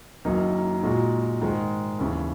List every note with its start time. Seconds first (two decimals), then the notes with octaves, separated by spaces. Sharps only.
0.25 F#1 F#2 D#3 A#3 D#4
0.83 A#2 G#3 D#4 F#4
1.41 G#2 D#3 G#3
1.99 D#2 C#3 E3